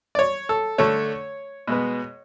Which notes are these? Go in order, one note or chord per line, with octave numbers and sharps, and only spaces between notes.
D5
C#5
A4
D3 A3 C#5
B2 G#3 B3